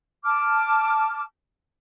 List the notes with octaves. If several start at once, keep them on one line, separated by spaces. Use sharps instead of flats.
A5 D6 F6